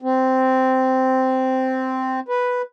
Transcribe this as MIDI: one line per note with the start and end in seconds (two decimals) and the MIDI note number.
0.02 2.20 60
2.28 2.62 71